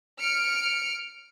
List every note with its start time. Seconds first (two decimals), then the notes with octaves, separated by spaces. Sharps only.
0.19 F6 C#7 D7